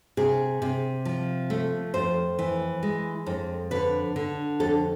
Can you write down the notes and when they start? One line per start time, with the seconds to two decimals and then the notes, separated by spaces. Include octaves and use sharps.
0.17 C3 G#4
0.62 C3
1.05 F3
1.50 A3
1.94 F2 C5
2.39 E3
2.83 G#3
3.26 F2
3.71 D3 B4
4.16 D3
4.60 F2 A4